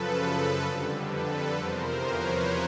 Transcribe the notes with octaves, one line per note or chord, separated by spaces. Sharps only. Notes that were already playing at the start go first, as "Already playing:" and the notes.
Already playing: F#2 C#3 F3 A4 B4
F2 D3 G3
A4 B4
E2 C3 F3 A#4 C5
B4 C#5